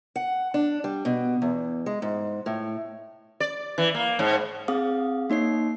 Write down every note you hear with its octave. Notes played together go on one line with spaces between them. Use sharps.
F#5
D4
G3
B2
E2
G#3
G#2
A2
D5
E3
A#3
G#2
C4 G#4 F5 D#6
A#3 D#4 C#5 C7